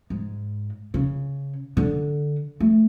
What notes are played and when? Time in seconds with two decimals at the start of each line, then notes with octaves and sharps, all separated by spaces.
0.10 G#2
0.94 C#3
1.77 D3
2.60 A3